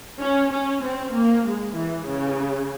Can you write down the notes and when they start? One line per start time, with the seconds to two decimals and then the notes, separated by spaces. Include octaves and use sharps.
0.21 C#4
0.52 C#4
0.83 C4
1.14 A#3
1.45 G#3
1.76 E3
2.08 C#3